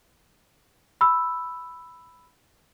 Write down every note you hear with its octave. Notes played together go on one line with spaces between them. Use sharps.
B5 E6